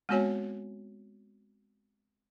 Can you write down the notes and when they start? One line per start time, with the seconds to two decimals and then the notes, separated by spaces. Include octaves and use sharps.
0.09 G#3 B3 C4 F#4 C#5 G#5